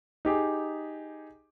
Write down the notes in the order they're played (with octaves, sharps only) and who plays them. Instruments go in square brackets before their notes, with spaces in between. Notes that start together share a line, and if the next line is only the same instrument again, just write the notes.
[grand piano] D#4 G4 G#4